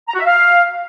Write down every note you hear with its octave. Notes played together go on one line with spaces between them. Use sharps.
A#5
F#4
E5
F5